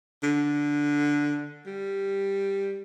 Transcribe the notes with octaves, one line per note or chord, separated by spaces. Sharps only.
D3
G3